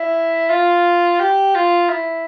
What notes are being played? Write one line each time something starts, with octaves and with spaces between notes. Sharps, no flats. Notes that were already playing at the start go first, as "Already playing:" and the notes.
Already playing: E4
F4
G4
F4
E4